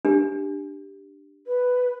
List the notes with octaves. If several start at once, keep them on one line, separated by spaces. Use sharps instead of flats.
D4 G4
B4